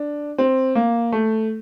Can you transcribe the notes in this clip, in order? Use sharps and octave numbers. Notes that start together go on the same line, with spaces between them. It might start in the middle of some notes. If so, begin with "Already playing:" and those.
Already playing: D4
C4
A#3
A3